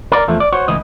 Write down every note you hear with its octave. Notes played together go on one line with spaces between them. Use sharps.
A#4 D5
E2 F3 A3
D5
F#4 C5 C#5
C#2 A2 E3 D#5